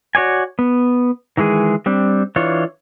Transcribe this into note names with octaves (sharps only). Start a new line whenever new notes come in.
F#4 C#5 D5 G#5
B3
D#3 E3 G#3 G#4
G3 C4 D4
E3 D4 F4 C#5